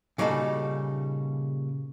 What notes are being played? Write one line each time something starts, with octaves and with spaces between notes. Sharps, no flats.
A#2 C#3 G3 D#4 F#4 A4